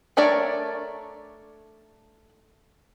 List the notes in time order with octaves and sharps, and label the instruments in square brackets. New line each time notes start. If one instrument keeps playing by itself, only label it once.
[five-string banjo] A3 D4 A#4 C#5 D5